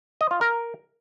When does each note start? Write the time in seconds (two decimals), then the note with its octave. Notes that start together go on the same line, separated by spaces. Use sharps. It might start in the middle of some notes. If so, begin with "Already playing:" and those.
0.21 D#5
0.31 F4
0.41 A#4